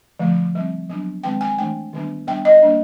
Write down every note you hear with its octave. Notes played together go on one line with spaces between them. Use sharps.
D3 F3 A3
G3 C4
F#3 B3 D4
D#3 G#3 C4 G5
G#5
E3 A3 D4 G5
D#3 G3 B3 D4
G3 B3 D4 G5
D#5
G3 A#3 D4